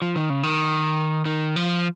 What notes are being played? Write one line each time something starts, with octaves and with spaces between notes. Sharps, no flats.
F3
D#3
C#3
D#3
D#3
F3